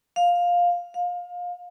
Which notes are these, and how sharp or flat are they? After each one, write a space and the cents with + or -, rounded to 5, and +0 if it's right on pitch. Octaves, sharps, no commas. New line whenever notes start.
F5 +10
F5 +25